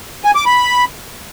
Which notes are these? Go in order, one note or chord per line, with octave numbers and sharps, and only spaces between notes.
G#5
D6
B5